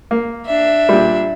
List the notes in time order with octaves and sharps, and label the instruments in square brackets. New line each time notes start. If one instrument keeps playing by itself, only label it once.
[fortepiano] A#3
[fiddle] D4 E5
[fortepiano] A#2 G3